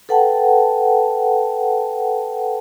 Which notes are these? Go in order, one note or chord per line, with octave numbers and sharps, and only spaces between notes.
A4 B4 F#5 G5 A5